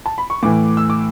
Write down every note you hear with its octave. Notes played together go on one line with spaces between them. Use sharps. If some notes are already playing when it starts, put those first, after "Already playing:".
A5
B5
C#6
A2 E3 D6
E6
D6